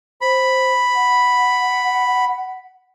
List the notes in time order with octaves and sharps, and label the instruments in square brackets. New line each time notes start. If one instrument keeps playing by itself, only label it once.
[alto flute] C5 [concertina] B5
[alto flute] F#5